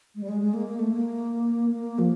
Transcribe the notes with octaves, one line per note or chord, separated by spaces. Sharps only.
G#3
G3
G#3
G#3
A#3
A#3
A3
A#3
A#3
F3